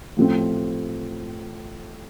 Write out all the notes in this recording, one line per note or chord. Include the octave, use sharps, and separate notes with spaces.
A1 A2 F3 A3 C4